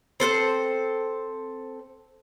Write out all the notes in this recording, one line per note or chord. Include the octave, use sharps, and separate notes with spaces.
C4 A4 A#4 C5